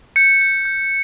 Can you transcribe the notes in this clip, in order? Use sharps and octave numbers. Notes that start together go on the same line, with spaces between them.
G6 C#7
G6
G6